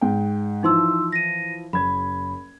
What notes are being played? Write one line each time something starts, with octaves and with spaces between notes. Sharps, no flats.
G#2 G5
E3 F3 D#4 E4 C6 E6
A#6 D#7
F#1 B5 G#6